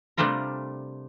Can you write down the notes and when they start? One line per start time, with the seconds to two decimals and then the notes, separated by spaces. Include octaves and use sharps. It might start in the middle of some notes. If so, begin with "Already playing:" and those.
0.17 C3 G3 A3 D4 F4 A#4